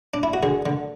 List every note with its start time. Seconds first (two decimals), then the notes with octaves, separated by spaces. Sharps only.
0.14 D4
0.23 E4
0.34 F#4
0.43 D3 G#4
0.66 D3